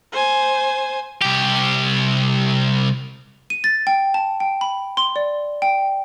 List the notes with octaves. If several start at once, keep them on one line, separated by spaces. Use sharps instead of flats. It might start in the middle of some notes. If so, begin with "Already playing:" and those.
C5 G#5
C2 G4
D#7
A6
G5
A5
G5
B5
C6
D5
G5